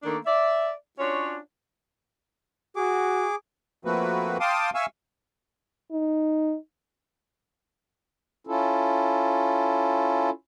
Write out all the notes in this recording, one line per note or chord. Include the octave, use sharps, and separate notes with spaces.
D#3 A3 A#3 D4
D5 E5
C#4 D4 F4 F#4 C#5
F#4 G#4 D6
F3 A3 A#3 C4 F#4 B4
F5 G5 A5 C6 D6 D#6
E5 F5 G#5 C#6 E6
D#4
C#4 E4 F4 A4